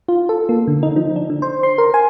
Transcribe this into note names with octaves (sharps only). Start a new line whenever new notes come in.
F4
A4
A#3
D3
D#4
F3
D4
D3
C5
C6
A#4
G#5